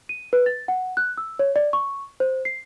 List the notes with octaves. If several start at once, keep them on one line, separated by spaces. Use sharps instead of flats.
D#7
B4
A6
F#5
F#6
E6
C#5
D5
C#6
C5
C7